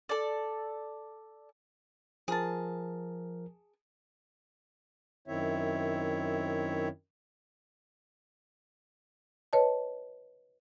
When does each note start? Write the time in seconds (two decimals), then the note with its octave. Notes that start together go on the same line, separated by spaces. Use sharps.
0.09 A4 D5
2.28 F3 G#4 A#4 A5
5.28 F#2 D#3 C4 E4 C#5 E5
9.53 B4 C#5 D#5 A5